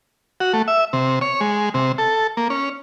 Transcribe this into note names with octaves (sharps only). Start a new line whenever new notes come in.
F#4
A3
E5
C3
C#5
G#3
C3
A4
A#3
C#4